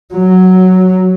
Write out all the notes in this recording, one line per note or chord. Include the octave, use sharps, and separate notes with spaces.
F#3